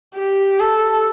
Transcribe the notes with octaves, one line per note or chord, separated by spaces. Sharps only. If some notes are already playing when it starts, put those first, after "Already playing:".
G4
A4